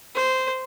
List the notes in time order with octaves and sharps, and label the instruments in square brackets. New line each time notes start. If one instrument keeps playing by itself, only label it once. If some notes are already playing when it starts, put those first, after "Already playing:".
[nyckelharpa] C5